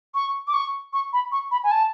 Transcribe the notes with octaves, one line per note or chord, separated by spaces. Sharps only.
C#6
D6
C#6
C#6
B5
C#6
B5
G#5
A5